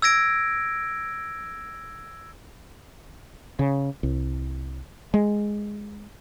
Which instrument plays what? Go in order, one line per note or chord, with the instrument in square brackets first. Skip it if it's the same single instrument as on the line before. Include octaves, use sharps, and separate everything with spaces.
[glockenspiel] E6 G#6 A#6 D7
[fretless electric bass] C#3
C2
G#3